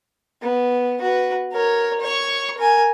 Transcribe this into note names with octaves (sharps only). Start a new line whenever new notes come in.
B3
F#4 B4
A#4 C#5
C#5 C#6
A#4 G#5